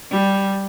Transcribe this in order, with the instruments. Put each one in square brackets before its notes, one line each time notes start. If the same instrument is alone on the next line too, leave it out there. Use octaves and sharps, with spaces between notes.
[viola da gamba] G3